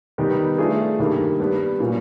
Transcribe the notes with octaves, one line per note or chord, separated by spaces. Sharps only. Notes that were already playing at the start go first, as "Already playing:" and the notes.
D#3 G3 B3 D#4 G4
A3 D4 F4 G#4
G2 D#3 G3 A#3
G3 B3 D4 G4 B4
A#2 F#3 A#3 C#4 F4